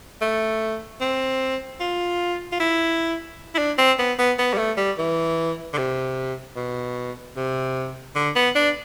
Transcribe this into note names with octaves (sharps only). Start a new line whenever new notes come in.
A3
C4
F4
F4
E4
E4
D4
C4
B3
B3
B3
G3
A3
G3
E3
D3
C3
B2
C3
D3
B3
D4